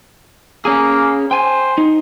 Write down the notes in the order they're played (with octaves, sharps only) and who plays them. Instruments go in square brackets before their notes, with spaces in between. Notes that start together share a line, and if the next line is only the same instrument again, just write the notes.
[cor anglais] A#3 [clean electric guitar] C#4 G#4
[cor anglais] C5 [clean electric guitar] G5 G#5
[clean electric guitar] D#4